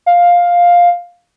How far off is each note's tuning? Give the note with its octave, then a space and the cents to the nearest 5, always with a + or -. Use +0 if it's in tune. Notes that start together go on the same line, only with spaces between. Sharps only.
F5 +5